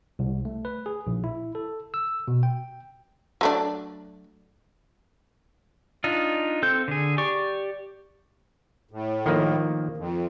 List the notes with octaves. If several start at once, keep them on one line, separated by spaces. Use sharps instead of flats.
C2
A3
B4
G#4
A#1
E4
A4
E6
B2
G5
F#3 A3 D4
D4 D#4 F4
C4 A4 G6
D3 G#4
G4 D5 C#6
A2
D#3 F3 A#3
F2